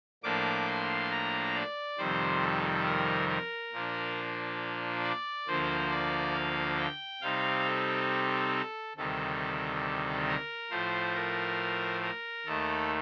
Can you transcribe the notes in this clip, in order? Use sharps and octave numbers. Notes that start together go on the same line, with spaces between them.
A2 F3 A#3 D4 D6
C6
A#5
D5
F2 C3 D#3 G3 C5
A4
A#4
A#4
A#2 F3 A#3 D4
D5
D2 D3 F3 A#3 C5
D5
F5
G5
C3 G3 C4 D#4 F5
A4
D2 C3 D#3 G3 A4
A#4
A2 F3 A3 C5
A#4
A#4
D#2 D#3 A3 A4